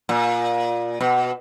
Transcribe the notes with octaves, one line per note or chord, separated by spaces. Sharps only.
A#2
B2